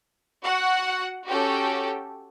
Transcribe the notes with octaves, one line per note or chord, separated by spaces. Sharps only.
F#4 F#5
C#4 F#4 G4 A4 G5